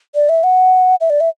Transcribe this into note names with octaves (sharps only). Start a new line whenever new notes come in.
D5
E5
F#5
E5
D5
E5